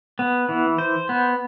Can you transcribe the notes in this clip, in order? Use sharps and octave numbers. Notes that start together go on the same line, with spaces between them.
B3
E3
C5
B3